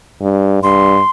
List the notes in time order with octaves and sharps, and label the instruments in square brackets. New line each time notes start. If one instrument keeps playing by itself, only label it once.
[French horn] G2
[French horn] G2 [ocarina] C6